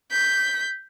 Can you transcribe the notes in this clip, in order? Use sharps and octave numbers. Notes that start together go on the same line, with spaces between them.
G6 B6